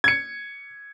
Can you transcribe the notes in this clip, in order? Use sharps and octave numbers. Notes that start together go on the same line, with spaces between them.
G#6 C#7